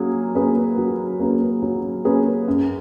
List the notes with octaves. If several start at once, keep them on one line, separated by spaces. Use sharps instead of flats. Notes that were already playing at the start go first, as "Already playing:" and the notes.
Already playing: F#3 A#3 C#4 G#4
A#3 C#4 G#4 B4
F#3
A#3 C#4 G#4 B4
F#3
A#3 C#4 G#4 B4
F#2